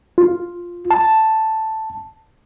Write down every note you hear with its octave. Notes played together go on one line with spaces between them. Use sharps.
F4
A5